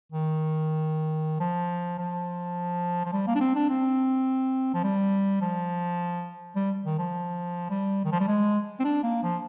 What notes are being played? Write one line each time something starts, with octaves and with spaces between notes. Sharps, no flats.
D#3
F3
F3
F3
G3
A#3
D4
C4
D4
C4
F3
G3
F3
G3
D#3
F3
G3
D#3
F3
G3
G#3
C4
D4
A#3
F3